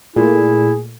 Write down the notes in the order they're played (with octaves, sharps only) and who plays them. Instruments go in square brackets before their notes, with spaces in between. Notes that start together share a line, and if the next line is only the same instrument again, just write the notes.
[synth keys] A#2 A3 [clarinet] E4 [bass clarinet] G#4